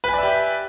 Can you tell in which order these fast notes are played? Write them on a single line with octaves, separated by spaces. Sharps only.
B4 G#5 D5 E5 G4